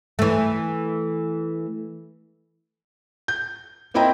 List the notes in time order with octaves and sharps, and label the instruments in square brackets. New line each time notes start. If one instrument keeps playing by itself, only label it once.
[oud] E3 A3
[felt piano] G6
A#3 C4 E4 D#5 G5 A#5